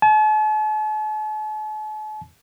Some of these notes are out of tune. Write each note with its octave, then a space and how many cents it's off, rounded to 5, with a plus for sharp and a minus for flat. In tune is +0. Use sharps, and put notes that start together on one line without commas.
A5 -45